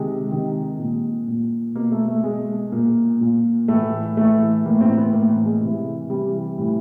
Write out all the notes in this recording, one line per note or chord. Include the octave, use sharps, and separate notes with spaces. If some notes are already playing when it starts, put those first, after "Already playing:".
Already playing: C3 D#3 G#3
C3 D#3
A#2
A#2
B2 A#3
A3
A3
B2 G#3
A#2 A#3
A#2
A2 E3 A3
A2 E3 A3
A2 E3 A#3
C4
B3
A2 E3 A#3
G#3
C3 E3
C3 E3 G3
A2 E3 G3